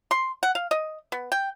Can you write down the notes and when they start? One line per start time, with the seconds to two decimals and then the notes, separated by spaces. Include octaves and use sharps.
0.11 C6
0.43 F#5
0.55 F5
0.71 D#5
1.12 B3
1.32 G5